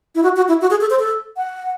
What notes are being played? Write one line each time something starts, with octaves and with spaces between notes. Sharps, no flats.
E4
F#4
F#4
E4
F#4
G#4
A4
C5
A4
F#5